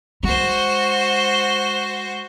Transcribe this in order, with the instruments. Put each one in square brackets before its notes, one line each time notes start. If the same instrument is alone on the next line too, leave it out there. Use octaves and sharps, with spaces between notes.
[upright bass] G#3 [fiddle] F#4 C5